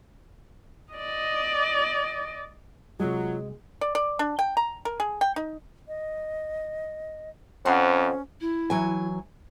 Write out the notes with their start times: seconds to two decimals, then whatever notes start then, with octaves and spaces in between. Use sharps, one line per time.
0.93 D5 D#5
3.00 C3 F#3 G#3 F4 F#4
3.81 D5
3.95 D5
4.19 D4
4.39 G5
4.57 A#5
4.85 A#4
5.00 G#4
5.21 G5
5.36 D#4
5.88 D#5
7.65 F2 C#4 C5 F#5 A#5 C6
8.40 E4
8.70 E3 F#3 G#5